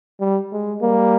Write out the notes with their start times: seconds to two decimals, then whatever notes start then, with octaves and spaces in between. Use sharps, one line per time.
0.21 G3
0.52 G#3
0.82 G3 A#3